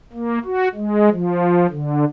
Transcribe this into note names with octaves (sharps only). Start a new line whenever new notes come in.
A#3
F#4
G#3
F3
D3